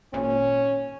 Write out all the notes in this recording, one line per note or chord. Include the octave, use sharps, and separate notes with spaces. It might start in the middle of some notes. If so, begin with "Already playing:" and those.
G#1 A#2 C#4